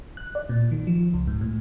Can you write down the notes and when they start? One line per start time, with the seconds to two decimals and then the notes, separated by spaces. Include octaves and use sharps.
0.17 F#6
0.35 D5
0.49 A#2
0.71 D#3
0.87 F3
1.14 C#2
1.27 G#2
1.41 A2